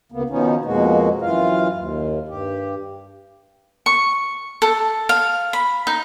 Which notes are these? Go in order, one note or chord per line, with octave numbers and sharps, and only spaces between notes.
D2 C#3 A#3 B3
B2 D#3 F3 B3 C#4 D#4
F2 B2 G#3 A#3 F#4
F#2 E3 F4 F5
D#2
G2 G4
C#6
A4
F5
B5
D#4